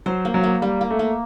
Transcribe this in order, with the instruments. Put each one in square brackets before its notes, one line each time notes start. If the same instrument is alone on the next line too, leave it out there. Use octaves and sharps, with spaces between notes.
[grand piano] F#3 [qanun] C5
[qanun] A#3
[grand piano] F#3
[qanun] A#3
[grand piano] G3 [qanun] A#3
[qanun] A#3
[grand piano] A3
[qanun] A#3